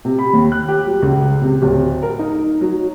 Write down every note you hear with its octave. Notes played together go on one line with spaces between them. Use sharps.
C3
B5
D#2
F#6
G4
F#3
C#2
C3
D1
A#4
D#4
F#3